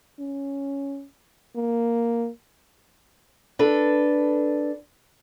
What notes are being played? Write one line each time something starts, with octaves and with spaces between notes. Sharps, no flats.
C#4
A#3
D4 A4 B4